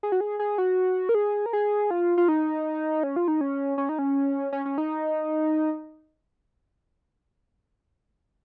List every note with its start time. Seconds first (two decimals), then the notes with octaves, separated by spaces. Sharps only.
0.03 G#4
0.12 F#4
0.20 G#4
0.39 G#4
0.58 F#4
1.09 A#4
1.15 G#4
1.46 A#4
1.53 G#4
1.91 F4
2.18 F4
2.28 D#4
3.03 C#4
3.16 F4
3.28 D#4
3.41 C#4
3.78 C#4
3.89 D#4
3.99 C#4
4.53 C#4
4.66 C#4
4.78 D#4